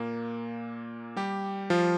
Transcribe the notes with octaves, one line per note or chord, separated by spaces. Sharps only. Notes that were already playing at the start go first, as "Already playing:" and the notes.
Already playing: A#2 A#3
G3 G4
F3 F4